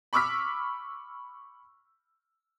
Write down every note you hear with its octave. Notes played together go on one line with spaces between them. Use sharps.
B5 C#6 D6 E6 F6 B6